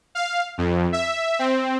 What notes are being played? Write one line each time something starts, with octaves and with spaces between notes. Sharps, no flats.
F5
F2
E5
C4